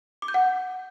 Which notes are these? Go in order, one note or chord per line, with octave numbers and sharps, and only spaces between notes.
D6
G6
F#5